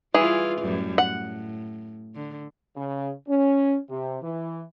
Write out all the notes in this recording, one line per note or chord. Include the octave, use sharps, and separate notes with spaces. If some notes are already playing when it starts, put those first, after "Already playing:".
E3 G3 E4 F4 G#4
F#2 A2 G3
A2 F#5
D3
C#3
C#4
C3
E3